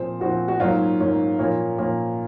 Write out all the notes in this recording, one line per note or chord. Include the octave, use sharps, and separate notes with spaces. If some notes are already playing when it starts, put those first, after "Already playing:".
Already playing: A#2 F3 C4 C5
A#2 F3 C4 F#4
F#4
G#2 F#3 A#3 C#4 F4
G#2 F#3 A#3 C#4
A#2 F3 A#3 C#4
A#2 F3 A#3 C#4